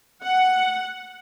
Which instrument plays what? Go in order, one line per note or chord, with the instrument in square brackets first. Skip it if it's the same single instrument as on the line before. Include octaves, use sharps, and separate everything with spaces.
[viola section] F#5